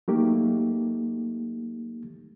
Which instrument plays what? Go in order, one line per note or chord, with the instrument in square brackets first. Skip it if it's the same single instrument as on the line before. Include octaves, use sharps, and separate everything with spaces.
[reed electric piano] F#3 A3 A#3 D#4 G4